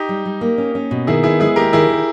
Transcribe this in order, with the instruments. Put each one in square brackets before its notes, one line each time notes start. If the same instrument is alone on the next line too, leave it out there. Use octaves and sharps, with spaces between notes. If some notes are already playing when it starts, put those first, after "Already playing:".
Already playing: [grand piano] D#4 G4
[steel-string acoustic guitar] G3
G3
A#3
C#4
C#4
B2
[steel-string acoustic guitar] D#3 [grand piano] E4 G#4
[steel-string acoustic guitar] B3 [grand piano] E4 G#4
[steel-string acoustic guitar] G#3 [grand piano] E4 G#4
[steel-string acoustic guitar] D#2 [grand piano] G4 A#4
[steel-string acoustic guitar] D#3 [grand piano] E4 G#4
[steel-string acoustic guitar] D#3